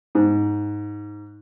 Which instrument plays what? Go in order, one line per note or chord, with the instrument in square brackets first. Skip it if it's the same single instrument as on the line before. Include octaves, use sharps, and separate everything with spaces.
[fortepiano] G#2